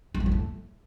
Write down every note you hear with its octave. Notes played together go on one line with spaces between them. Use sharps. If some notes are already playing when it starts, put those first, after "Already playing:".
G#3
F3
F#3
A3